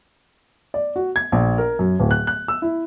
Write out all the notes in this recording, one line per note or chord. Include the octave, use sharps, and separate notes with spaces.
D5
F#4
G#6
A#1
A#4
F#2
D1
F#6
F#6
E6
E4